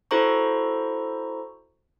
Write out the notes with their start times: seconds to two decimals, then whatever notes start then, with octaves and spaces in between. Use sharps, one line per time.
0.11 E4 F#4 A4 C5 A#5 C#6